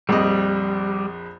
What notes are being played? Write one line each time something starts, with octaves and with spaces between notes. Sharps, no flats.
A#1 F2 G3 D#5